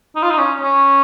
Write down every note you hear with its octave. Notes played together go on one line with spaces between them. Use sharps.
D#4
F4
D#4
C#4
C#4